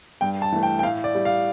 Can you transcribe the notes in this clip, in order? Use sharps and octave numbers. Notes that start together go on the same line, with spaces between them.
G2 G5
A5
E3 A3
G5
G5
A2 F5
D5
G3
F5